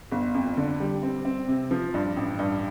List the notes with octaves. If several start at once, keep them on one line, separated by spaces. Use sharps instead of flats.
G1
F2
D3
G3
C4
C4
C3
F3
G2
A1
G2